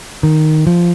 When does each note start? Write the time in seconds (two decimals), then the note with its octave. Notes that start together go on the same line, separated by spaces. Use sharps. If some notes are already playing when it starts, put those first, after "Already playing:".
0.23 D#3
0.67 F3